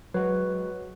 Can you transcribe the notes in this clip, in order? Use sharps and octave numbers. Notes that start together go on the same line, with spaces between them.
F#3 G#3 F#4 B4 C#5